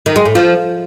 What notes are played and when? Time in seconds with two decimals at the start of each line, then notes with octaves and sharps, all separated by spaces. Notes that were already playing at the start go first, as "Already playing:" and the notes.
0.06 D#3
0.16 G#3
0.25 A2
0.35 F3